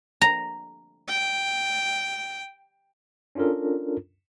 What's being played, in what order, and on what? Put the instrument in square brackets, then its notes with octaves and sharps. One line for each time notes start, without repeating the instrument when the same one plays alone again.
[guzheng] A#5
[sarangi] G5
[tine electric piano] C#4 D4 F4 A4 A#4